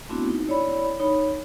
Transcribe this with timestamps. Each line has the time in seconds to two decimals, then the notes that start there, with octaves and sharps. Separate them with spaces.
0.09 A3 B3 C4 D4 E4 F#4
0.30 D#4
0.48 E4 C#5 D5 B5
0.99 D#4 C#5 B5